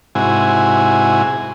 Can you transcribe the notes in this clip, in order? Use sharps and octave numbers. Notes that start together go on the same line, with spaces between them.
G#2 C3 E4 F#4 G#5